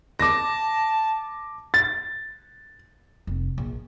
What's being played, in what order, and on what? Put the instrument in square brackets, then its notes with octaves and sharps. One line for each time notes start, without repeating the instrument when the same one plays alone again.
[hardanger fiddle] A5 [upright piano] D6 A#6
[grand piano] A6
[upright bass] F1
A#1